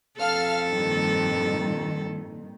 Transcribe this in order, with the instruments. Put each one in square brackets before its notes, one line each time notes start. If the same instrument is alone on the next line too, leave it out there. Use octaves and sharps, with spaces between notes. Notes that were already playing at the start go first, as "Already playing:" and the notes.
[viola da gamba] F2 A4 [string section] F5 A5 F6
[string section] G2 A#2 D#3